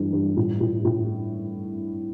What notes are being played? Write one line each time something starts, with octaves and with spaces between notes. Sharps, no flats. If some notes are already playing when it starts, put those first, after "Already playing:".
Already playing: G2 E3
G2
A2
A2
A2